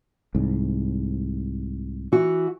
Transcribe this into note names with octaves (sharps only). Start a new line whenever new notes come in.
C2 G#2
E3 F#4